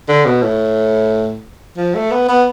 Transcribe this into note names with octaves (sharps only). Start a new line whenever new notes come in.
D3
B2
A2
F3
A3
B3
B3